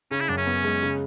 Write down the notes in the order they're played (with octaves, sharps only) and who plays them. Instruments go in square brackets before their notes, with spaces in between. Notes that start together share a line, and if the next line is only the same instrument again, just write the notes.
[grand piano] C#3 [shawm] C#4
[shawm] E4
[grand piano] F#2 [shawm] D4
[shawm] C#4
[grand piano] B3
G#3
C#3